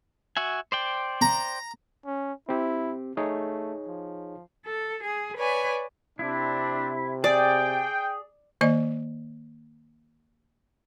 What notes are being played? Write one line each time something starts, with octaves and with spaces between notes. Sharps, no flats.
F#4 E5 G#5
C5 D5 G5
A#5
C#4
C4 E4 G4
A3 D#4 G#4 C#5
F3
A4
G#4
B4 C#5 D5 G#5
C3 C4 D4 E4
G#4 D5 G5
D#3 A#3 D5 D#5